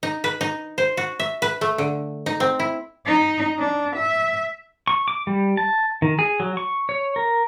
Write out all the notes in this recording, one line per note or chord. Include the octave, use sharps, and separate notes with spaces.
D#4
B4
D#4
C5
F#4
E5
B4
A3
D3
D#4
C4
E4
D#4
D4
E5
C#6
D6
G3
A5
D#3
G#4
F#3
C#6
C#5
A#4